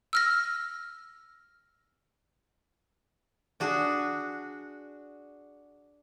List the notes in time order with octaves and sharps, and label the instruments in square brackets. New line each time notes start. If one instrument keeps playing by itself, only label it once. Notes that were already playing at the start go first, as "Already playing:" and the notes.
[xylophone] E6 F6 A#6
[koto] D4 F#4 G#4